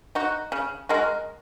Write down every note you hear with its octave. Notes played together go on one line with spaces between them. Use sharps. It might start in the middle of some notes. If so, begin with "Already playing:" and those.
D#4 F#4
C#3
G#3 F#4 A#4